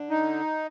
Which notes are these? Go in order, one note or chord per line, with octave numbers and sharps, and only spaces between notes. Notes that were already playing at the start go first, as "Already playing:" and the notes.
Already playing: D3
D#4